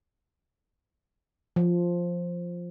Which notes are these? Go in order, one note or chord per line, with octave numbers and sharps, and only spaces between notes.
F3